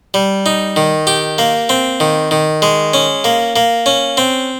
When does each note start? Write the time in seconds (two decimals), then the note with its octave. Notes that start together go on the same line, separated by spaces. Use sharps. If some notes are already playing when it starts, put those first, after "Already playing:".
0.14 G3
0.46 D#4
0.76 D#3
1.07 G4
1.38 A#3
1.69 C4
2.00 D#3
2.31 D#3
2.62 G#3
2.94 C#4
3.24 A#3
3.56 A#3
3.86 C#4
4.17 C4